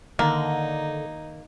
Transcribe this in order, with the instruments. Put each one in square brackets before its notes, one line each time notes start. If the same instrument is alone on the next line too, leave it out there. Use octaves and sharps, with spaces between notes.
[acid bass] D3 [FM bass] D#3 [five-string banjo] A#3 [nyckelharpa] D#4